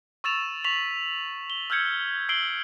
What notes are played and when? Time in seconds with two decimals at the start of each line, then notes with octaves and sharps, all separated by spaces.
0.24 C#6 E6 A6 E7 F7
0.64 C#6 B6 F7 F#7
1.50 G7
1.70 E6 F6 G6 G#6 C#7
2.29 E6 C7 D7 F#7 G7